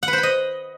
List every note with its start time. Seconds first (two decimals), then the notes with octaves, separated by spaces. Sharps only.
0.03 F#5
0.08 B4
0.13 C5
0.18 B5
0.23 D#5